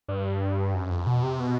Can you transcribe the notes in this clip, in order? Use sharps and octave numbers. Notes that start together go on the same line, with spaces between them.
G2
F#2
F2
B2
C3
B2